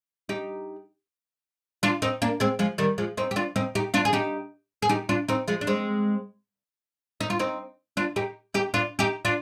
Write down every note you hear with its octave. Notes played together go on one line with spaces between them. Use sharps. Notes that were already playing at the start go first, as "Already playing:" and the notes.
D#4 G4
D4 F4
C4 D#4
A#3 D4
G#3 C4
F3 G#3
D#3 G3
F3 G#3
C4 D#4
G4
D4 F4
C4 D#4
D#4 G4
D4 F4
G#4
D#4 G4
G#4
D#4 G4
D4 F4
C4 D#4
F3 G#3
D4
G#3 C4
D#4
F4
C4 D#4
D4 F4
D#4 G4
D#4 G4
D4 F4
D#4 G4
D4 F4